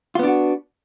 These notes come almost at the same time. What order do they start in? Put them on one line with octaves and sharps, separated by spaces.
F4 B3 D4 F#4